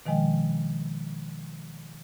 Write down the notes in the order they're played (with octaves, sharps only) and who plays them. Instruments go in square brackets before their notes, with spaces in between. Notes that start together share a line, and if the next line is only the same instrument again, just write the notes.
[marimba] B2 D#3 F3 G#3 D#5 G5